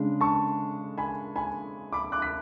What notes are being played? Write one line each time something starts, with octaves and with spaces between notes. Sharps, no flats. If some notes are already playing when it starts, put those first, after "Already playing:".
Already playing: C#3 G#3 D4
A5 C#6
G#5 B5
G#5 B5
B5 D6
D6 F#6
B6